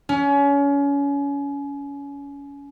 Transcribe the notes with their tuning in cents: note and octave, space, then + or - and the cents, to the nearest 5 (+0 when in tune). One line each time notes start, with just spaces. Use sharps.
C#4 +30